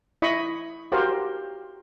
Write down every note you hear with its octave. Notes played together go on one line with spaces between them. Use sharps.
E4 D#5 B5 C#6
F#4 G4 A#4 C5 F5